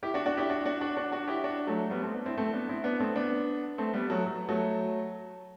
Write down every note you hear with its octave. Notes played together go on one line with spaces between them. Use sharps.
E4 G4
D4 F#4
D4 F#4
E4 G4
D4 F#4
D4 F#4
D4 F#4
D4 F#4
D4 F#4
E4 G4
D4 F#4
F#3 A3
G3 B3
A3 C4
B3 D4
C4 E4
A3 C4
B3 D4
C4 E4
B3 D4
A3 C4
B3 D4
A3 C4
G3 B3
F#3 A3
F#3
F#3 A3